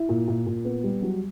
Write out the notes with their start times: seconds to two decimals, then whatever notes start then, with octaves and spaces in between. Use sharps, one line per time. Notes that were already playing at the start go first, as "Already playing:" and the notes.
Already playing: E4
0.09 A#2
0.28 A#2
0.46 A#2
0.65 B3
0.84 G3
1.02 F#3